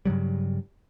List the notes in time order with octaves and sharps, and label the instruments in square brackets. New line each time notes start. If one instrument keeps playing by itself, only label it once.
[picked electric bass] G2 C#3 F#3 G3